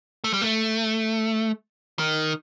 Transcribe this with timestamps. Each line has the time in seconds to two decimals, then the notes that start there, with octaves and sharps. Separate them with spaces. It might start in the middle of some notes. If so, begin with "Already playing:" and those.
0.24 A3
0.33 G3
0.41 A3
1.99 D#3